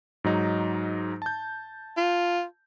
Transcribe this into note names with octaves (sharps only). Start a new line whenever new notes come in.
G#2 F#3 D#4
A5 G6
F4